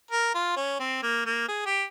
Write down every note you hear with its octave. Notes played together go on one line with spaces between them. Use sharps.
A#4
F4
C#4
C4
A#3
A#3
G#4
G4